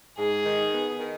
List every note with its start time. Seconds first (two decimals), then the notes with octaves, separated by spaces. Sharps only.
0.18 G#2 G#4
0.46 D#3
0.73 B3
0.99 D#3